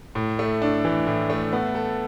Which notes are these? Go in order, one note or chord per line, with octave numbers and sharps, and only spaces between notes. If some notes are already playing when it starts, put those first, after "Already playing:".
A2
A3
D4
E3
A2
A3
B3
A4